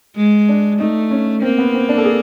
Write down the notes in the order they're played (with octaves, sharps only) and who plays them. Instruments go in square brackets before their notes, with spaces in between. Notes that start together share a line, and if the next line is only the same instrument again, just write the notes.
[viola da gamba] G#3
[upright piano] D4
[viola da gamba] A3 [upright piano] D#4
[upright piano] C#4
[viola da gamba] A#3 [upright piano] C4
[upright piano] B3
C4
D4
A4
G#4